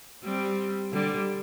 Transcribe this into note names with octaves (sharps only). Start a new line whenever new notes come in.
G3 C4
D3 G3